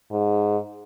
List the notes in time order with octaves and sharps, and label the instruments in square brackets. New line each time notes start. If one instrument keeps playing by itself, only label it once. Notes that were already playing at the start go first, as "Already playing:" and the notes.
[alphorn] G#2